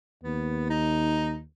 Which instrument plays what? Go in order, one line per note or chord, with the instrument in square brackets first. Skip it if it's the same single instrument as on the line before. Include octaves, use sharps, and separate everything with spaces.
[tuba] D#2 [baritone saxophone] B3
[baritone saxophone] D#4